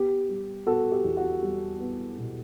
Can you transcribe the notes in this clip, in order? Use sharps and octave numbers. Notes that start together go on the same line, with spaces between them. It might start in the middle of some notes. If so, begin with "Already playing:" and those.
Already playing: B3 G4
G3
B3 F#4 A4
G4
E2
F#4
G3
B3
B2